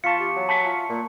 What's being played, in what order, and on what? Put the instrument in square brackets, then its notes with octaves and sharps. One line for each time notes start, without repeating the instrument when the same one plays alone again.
[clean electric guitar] E2 A5 [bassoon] F4 [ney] F5 [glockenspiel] C#6 B6 C#7
[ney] G4
[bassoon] F#3
[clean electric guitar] E5 F#5 B5 [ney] G#5 [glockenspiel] A5
[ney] F4
[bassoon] A#2 [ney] A#3